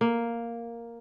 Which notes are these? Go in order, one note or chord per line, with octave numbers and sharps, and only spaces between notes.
A#3